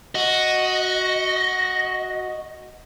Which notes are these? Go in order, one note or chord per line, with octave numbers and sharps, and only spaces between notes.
F#4 D#5